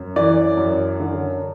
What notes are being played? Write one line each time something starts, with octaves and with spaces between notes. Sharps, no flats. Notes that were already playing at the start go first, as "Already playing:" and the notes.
Already playing: F#2
E3 D5
F#2
D3